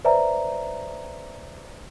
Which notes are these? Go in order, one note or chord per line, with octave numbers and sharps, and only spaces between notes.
B4 C5 D5 E5 G#5 A#5